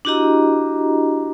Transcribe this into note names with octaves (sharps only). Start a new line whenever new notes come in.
D4 E4 F#4 G4 D#5 A#5